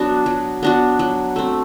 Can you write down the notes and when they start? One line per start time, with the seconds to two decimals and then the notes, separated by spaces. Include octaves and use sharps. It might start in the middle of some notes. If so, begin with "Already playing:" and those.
Already playing: F#3 B3 D4 F#4
0.26 F#3
0.63 B3 D4 F#4
0.99 F#3
1.36 A3 C4